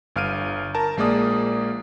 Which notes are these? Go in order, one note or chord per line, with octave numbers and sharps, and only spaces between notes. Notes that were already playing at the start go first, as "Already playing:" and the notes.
G1 F5 F6 D7 D#7
A#4 A5
A#1 G#3 A#3 G#4 D5 D#6